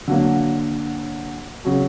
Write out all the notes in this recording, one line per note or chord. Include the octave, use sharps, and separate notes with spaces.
D3 F#3 A#3
C#3 F#3